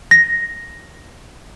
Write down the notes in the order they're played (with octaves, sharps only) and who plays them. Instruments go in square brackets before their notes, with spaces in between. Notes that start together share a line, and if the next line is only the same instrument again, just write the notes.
[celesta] A#6